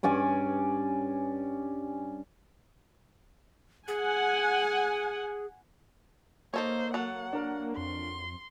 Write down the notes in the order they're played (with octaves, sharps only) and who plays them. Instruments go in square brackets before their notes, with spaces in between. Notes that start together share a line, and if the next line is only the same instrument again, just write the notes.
[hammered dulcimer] G2 C#4 D5 G#5
[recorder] G#4 [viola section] F#5 G#5
[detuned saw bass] A#3 [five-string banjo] D#4 A4 C#5 [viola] C5
[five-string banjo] F#3 A4 [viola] F#5
[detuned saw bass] A#3 [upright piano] D4 A#4
[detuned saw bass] F2 [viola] C6